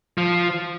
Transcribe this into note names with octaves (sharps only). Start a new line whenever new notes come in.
F3